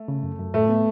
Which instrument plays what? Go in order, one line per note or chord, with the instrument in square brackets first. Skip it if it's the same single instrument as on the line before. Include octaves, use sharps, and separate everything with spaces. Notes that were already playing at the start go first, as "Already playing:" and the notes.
Already playing: [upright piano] A3
[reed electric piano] C#3
F#2
F#2
[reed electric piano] A2 [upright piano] A3
[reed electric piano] B3